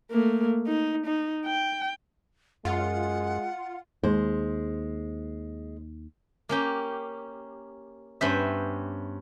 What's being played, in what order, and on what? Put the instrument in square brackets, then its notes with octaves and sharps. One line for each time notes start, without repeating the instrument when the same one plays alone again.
[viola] A3 A#3
D#4
D#4
G5
[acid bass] F#2 [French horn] G#3 [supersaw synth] F4 [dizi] F#5
[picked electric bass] D#2 [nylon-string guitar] G#3 C5
[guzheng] A#3 C#4 G4
G2 B3 C#4 C5 E5